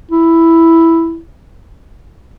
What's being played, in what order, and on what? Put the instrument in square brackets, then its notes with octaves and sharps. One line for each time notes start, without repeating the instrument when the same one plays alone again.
[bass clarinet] E4